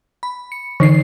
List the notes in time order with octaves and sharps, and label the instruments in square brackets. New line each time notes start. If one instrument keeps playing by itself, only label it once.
[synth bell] B5
C#7
[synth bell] D3 D#4 C7 [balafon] E3